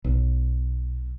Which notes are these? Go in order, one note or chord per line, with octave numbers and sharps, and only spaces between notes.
B1